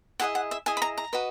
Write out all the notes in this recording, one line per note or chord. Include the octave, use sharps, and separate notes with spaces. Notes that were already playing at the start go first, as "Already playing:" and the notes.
E4 G#4 D#5 F#5
F#5
E5
E4 G#4 D#5 G#5
B5
A#5
A#5
F#4 B4 D#5